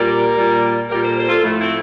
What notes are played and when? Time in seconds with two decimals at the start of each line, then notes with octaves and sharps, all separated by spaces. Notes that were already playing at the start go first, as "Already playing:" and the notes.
Already playing: A#2 G3 G4 A#4
0.37 A#2 G3
0.90 A#2 G3 G4 A#4
1.03 A4 C5
1.16 A4 C5
1.28 F4 A4
1.42 A2 F3 A3
1.59 C4 E4